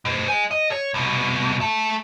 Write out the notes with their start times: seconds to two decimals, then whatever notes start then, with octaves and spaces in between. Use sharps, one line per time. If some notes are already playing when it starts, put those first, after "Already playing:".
0.05 B2 C5
0.28 D#5 G#5
0.51 D#5
0.71 C#5
0.94 C2 B2
1.61 A3 A4